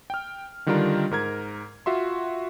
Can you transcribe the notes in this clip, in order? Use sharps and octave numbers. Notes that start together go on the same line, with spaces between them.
G5 F6
D3 D#3 G3 D4 F4 A#4
G#2 A#4 G#6
F4 F#4 E5 C6